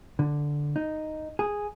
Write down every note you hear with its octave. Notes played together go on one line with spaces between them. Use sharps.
D3
D#4
G#4